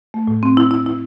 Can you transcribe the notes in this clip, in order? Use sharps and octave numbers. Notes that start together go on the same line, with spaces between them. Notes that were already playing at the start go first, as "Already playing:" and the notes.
A3
A2
C4
E4
E4
E4